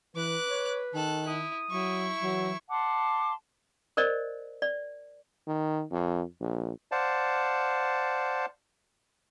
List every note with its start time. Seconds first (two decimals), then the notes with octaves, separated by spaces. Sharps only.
0.16 E3 B4 D6 F#6
0.50 C#5
0.94 D#3 A4 F#6
1.28 E4 D#6
1.71 F#3 E4 C#6
2.23 E3 F#3
2.69 F#5 A5 C6 D6
3.97 A#4 C5 D5 D#5
4.62 D5
5.47 D#3
5.91 F2
6.40 A#1
6.92 C5 D5 F5 F#5 A5